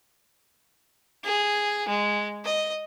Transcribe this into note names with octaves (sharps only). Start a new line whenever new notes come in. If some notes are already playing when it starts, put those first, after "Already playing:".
G#4
G#3
D#5